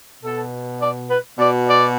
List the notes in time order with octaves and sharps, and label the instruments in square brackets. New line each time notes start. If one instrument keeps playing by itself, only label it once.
[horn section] B2 A4
D5
B4
B2 D5
D5